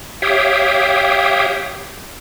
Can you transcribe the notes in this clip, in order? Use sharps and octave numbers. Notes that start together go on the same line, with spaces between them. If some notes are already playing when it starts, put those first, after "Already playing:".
G4 C#5 E5 F5 G5 D#6